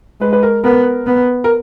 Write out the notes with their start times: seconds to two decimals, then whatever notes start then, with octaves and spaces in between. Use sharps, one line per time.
0.21 G#3 B4
0.33 B4
0.43 A#4
0.64 B3 A#4
1.07 B3
1.44 A#4